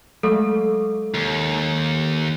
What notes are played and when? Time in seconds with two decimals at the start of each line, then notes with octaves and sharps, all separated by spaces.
0.23 F#3 G#3 A3 A4
1.14 D#2